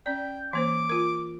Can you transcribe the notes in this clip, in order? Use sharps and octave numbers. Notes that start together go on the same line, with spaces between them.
C#4 D5 G5
E3 A#3 C5 D6
F4 A#4